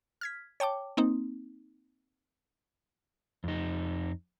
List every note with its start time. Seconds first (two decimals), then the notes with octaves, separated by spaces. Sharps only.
0.21 F6 G#6 B6
0.60 C#5 G5 A5 D6
0.97 A#3 C4 D#4
3.44 F2 D#4